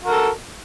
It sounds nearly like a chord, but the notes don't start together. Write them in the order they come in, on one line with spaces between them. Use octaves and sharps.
F#4 A#4 A4